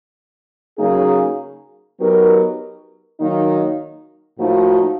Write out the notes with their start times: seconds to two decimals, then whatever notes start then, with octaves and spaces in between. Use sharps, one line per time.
0.78 C#3 F#3 A#3 D#4 G#4
1.98 F#3 B3 D#4 G4 A#4
3.19 D#3 F#3 A#3 D#4
4.39 A2 F3 A#3 D#4 F#4